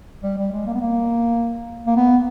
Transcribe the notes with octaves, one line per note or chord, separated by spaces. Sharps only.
G3
G3
G#3
A#3
B3
A#3
A#3
B3